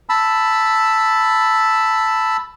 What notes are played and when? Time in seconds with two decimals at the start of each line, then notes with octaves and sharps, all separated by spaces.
0.09 A5 B5 E6